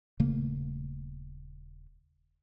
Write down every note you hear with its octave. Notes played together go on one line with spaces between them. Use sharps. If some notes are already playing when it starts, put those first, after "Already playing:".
D#1 C#3 A3 A#3